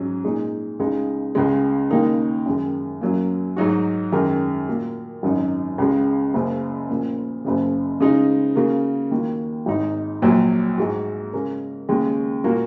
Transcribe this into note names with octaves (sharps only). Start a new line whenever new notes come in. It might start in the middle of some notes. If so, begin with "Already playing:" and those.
Already playing: G#2 F#3 C#4
A#2 G#3 D#4 G#4
C#2 C#3 G#3 D#4
C#2 C#3 G#3
D#2 C#3 A#3 D#4 A#4
F#2 D#3 G#3
F#2 F#3 A#3
G#2 F#3 D#4 F#4
F#2 D#3 G#3 C#4 A#4
A#2 A#3 F#4 A#4
G#1 F#2 F#3 D#4
C#2 C#3 G#3
F#1 F#2 C#3
A#1 A#2 A#3 C#4
F#1 F#2 C#3
C#3 G#3 D#4
C#3 A#3 F#4 A#4
D#2 D#3 A#3 F#4
G#1 G#2 G#3 D#4
A#1 A#2 F#3
G#2 G#3 F#4
C#3 G#3 C#4 A#4
D#2 C#3 G#3
A#2 A#3 F#4 A#4